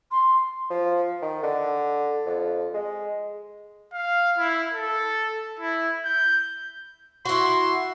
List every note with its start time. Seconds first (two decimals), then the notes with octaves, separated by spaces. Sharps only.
0.11 C6
0.70 F3
1.22 D#3
1.43 D3
2.26 F2
2.74 G#3
3.93 F5
4.38 E4
4.73 A4
5.59 E4
6.05 G6
7.25 E4 F#4 C6